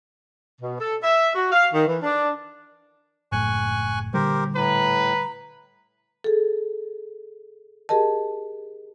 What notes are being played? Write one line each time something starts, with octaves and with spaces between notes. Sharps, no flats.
B2
A4
E5
F#4
F5
D#3
E3
D4
F#1 A2 G#5 C#6 F#6
A#2 D3 G3 G4 A#4 C5
A2 B4 A#5
G#4 A4
G4 G#4 A#4 D#5 A5